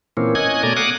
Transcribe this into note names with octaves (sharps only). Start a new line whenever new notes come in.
A#2 E3 A#3 C4 C#4
C#4 D#5 G#5 F#6 G#6
B2 A3 D5 G#5 A#5 D#6
F5 F#5 G#5 D6 D#6 F#6